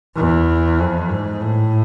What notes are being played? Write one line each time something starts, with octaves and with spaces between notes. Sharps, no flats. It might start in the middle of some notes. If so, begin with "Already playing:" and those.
E2
F2
G#2
A2